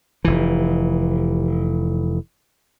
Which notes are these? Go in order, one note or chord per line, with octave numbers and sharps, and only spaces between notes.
F1 E3